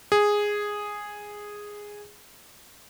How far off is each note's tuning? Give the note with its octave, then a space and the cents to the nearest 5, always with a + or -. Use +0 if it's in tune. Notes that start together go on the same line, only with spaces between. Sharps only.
G#4 -5